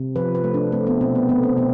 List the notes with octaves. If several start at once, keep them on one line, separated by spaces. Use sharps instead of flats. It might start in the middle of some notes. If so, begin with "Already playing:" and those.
Already playing: C3
F3 B4
B4
A3
D4
A3 C4
B3
B2 C4
B3
A3 B3
C4
B2 B3